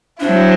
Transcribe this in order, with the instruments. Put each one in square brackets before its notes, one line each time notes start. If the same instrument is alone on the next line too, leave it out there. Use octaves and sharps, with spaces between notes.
[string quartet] F#3 C4 E4 [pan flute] D4